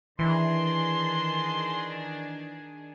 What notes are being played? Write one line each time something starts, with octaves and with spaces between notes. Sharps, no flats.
D#3 E3 D4 G#4 C6